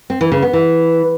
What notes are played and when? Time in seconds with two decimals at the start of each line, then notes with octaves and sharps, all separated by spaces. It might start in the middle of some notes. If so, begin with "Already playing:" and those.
0.10 C4
0.21 E3
0.32 C#3
0.42 B3
0.53 E3